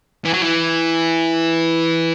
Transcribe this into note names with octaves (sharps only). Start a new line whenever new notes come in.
E3
F#3
E3